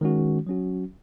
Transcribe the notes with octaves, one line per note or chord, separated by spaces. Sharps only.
D#3 G#3 C#4 F#4
F#3 C#4 F#4